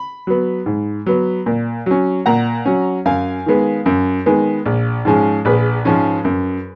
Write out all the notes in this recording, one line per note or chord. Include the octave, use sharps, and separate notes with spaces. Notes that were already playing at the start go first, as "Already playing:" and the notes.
Already playing: B5
F#3 B3
G#2
F#3 B3
A#2
F#3 C#4
A#2 F#5 A#5
F#3 C#4
F#2 F5 G#5
D#3 G#3 B3
F#2
D#3 G#3 B3
A#1
G#2 F3 G#3 C#4
A#1 G#4 B4
G#2 F3 G#3 C#4
F#2